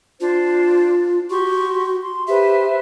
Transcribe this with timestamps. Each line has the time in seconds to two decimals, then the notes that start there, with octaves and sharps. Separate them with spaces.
0.20 D4 F4 C5
1.30 F#4 G4 C6 C#6
2.02 C6
2.28 G4 B4 C5 E5